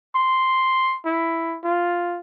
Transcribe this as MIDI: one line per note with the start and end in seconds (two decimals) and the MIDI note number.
0.15 0.99 84
1.05 1.58 64
1.64 2.20 65